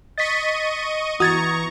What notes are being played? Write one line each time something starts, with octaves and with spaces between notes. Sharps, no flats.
D#5 C#6 A6 B6 D#7
E3 B3 F#4 A#5 C#6 D#6 G#6 A6